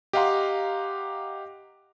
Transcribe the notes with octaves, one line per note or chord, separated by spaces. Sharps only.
G4 D#5 F5 F#5 A#5 C6